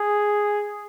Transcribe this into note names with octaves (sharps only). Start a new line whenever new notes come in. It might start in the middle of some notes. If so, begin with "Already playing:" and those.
Already playing: G#4